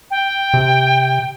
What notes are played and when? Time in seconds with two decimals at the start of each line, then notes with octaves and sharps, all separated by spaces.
0.11 G5
0.54 C3